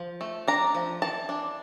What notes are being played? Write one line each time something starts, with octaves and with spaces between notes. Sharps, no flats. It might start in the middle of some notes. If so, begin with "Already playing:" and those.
Already playing: F3
A3
D4 A#5
F3
E3 A5
D4